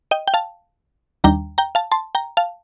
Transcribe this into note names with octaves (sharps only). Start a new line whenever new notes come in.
D#5 G5
G5
F5 A5
D#2 D#3 G3 D4 G5 A#5
G5 A#5
F5 A5
A5 C6
G5 A#5
F5 A5